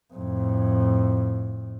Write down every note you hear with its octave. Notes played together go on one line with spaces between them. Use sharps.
F2 A2